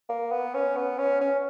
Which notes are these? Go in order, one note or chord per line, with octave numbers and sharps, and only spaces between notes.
A#3
B3
C#4
B3
C#4
C#4